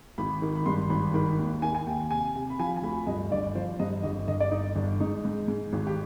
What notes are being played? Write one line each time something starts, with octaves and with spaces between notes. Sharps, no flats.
G#1 B5
D#3
B5
G2 C6
G#1 B5
D#3 B5
D#2
D#3 G#5
G#5
D#2 G5
C3 G#5
C3
B5
F3 G#5
G#5
D2 B5
G2 D#5
G1 D5
F3 C5
G2 D#5
G1 D#5
G1 D#5
D5
G1 D#4
G1 D4
G#2 D#4
G#2
G#2
G#1
G4